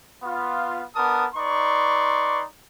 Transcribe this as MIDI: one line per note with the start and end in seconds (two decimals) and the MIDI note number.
0.23 0.82 59
0.23 0.82 65
0.96 1.25 59
0.96 1.25 62
0.96 1.25 70
0.96 1.25 81
0.96 1.25 87
1.35 2.43 63
1.35 2.43 71
1.35 2.43 74
1.35 2.43 84
1.35 2.43 85